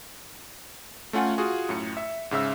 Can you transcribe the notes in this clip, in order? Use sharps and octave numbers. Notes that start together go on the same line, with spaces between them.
A3 C#4 F4 F#5 G#5
F4 F#4 G#4
F#2 A2 C#7
E5
G#2 C#3 E5 E6